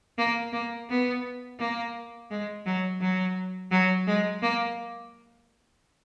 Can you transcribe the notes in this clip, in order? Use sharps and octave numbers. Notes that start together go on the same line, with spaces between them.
A#3
A#3
B3
A#3
G#3
F#3
F#3
F#3
G#3
A#3